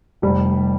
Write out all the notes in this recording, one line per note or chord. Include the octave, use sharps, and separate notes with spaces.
F1 G3